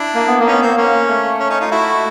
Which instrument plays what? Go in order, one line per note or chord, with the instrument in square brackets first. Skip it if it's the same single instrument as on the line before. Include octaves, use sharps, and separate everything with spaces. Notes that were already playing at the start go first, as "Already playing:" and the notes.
Already playing: [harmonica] D4 E4
[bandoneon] A#3
B3
A#3
[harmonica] C#4 D#4
[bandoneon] B3
[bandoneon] A#3 [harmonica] C4
[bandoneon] A#3 [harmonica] C#4
[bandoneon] A3
[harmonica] C#4
C#4 D#4
D#4 F4
[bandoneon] A3 [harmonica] E4 F#4